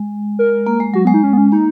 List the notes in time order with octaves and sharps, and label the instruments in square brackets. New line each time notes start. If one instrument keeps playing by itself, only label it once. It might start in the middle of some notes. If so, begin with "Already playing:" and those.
Already playing: [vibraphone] G#3
[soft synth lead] A#4
[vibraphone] A#3
G#3
[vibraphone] F#3 [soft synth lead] F#4
[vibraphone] G#3 [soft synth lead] B3
[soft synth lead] D#4
C#4
B3
C#4
[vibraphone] A#3 [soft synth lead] D#4